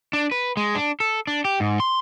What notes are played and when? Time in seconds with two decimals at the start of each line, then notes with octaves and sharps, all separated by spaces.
0.13 D4
0.31 B4
0.57 G#3
0.75 D4
1.00 A4
1.27 D4
1.45 G4
1.60 G#2
1.80 C6